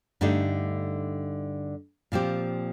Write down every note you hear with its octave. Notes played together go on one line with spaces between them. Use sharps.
G2 D3 A3 D#4 G4
A#2 F3 C4 G4